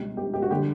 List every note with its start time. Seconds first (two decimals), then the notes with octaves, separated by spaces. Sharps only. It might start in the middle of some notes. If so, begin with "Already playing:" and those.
Already playing: C#2 B2 G3
0.17 G4
0.34 G4
0.42 F#4
0.51 D3 G3 G4